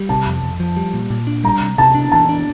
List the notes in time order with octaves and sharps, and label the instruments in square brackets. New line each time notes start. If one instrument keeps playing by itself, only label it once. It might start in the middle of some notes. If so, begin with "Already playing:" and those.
Already playing: [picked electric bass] G3
[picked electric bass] C3 [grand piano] A5
[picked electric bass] F2
F2
F3
G3
A#2
A#2
D4
[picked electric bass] G3 [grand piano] A#5
[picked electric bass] C3
[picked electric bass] C3 [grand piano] A5
[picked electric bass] D4
[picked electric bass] E3 [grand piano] A5
[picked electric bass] D4